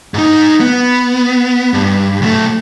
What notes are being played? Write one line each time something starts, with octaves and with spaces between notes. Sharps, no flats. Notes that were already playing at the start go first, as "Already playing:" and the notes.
G#2 D#4
B3
G2
B1 A3